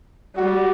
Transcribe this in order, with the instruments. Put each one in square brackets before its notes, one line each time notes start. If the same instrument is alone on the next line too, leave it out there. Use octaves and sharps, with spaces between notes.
[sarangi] G3 [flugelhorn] F#4